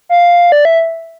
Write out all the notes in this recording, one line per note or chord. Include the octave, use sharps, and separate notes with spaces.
F5
D5
E5